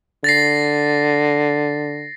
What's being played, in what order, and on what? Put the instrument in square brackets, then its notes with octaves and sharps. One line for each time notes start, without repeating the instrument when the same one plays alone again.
[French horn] D3 [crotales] A6 A#6 C7